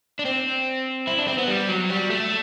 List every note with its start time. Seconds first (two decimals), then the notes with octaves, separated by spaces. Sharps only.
0.19 D4
0.25 C4
1.07 E4
1.18 D4
1.28 C4
1.38 B3
1.48 G3
1.69 F#3
1.89 G3
2.10 A3